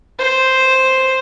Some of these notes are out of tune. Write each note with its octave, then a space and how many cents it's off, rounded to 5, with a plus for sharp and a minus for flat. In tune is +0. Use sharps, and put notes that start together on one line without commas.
C5 +0